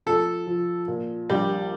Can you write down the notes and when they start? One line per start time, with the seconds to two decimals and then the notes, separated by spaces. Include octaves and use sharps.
0.06 F3 A4
0.47 F3
0.88 A#2
1.30 A#1 G3